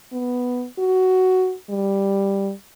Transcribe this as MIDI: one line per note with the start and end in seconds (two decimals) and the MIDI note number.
0.13 0.66 59
0.78 1.55 66
1.70 2.52 55